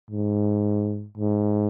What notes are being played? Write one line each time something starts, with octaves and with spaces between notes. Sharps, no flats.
G#2
G#2